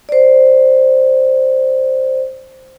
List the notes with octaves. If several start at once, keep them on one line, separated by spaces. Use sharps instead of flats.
C5 D5